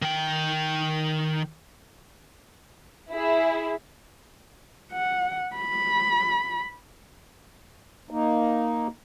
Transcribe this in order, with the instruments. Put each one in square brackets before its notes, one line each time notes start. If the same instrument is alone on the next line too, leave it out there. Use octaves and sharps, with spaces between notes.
[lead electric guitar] D#3 G5
[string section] E4 G#4
[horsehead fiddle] F#5
B5
[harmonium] A#3 D#4